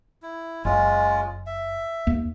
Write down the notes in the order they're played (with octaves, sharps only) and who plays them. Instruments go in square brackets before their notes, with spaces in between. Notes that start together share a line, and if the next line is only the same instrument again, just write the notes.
[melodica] E4
[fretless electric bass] F#1 [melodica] G#3 C#4 F4
[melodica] E5
[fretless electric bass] D#2 A#3